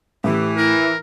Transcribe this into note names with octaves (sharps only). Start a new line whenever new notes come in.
A2 E3 G4
E4 A#4